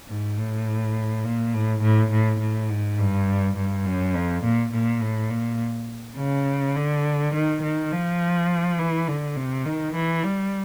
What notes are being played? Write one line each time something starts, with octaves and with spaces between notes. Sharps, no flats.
G#2
A2
A#2
A2
A2
A2
A2
G#2
G2
G2
F#2
F2
A#2
A#2
A2
A#2
C#3
D3
D#3
D#3
F3
E3
D3
C3
D#3
E3
G3